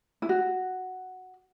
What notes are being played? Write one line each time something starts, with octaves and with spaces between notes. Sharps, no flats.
E4
F#4